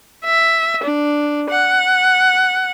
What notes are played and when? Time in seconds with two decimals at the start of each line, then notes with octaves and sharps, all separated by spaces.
0.25 E5
0.83 D4
1.50 F#5